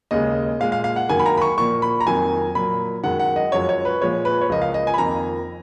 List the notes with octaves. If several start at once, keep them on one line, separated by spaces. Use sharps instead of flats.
D#2 C#3 G#3 D#5
A#2 G#3 F5
F5
F5
F#5
F#2 D#3 A#3 G#5
B5
A#5
B5
C#6
A#2 F3 A#3 C#6
B5
A#5
F2 D#3 F#3 A#3 G#5
A#2 F#3 A#3 B5
F#2 D#3 G#3 F#5
F#5
D#5
F#2 F3 G#3 C#5
C#5
B4
A#2 F3 G#3 C#5
B4
C#5
C#2 C#3 F3 A#3 D#5
F5
D#5
G#5
B5
F2 D#3 A#3 A#5